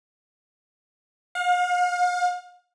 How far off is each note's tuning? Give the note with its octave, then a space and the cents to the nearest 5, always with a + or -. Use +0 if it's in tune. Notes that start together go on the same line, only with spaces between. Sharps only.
F5 +40